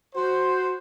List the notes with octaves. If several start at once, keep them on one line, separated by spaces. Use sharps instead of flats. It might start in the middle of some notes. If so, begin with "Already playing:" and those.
F#4 C5